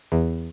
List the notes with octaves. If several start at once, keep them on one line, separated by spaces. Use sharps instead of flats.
E2